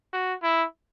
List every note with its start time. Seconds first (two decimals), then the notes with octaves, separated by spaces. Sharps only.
0.13 F#4
0.43 E4